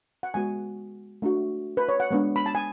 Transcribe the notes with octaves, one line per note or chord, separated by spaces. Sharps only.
F#5
G#3 B3 F#4 G#5
A3 D4 F#4
B4
C#5
F#5
G#3 B3 D4
B5
A5
G#5